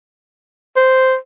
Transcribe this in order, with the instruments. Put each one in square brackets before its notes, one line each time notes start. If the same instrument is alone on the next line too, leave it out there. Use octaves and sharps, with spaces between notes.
[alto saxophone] C5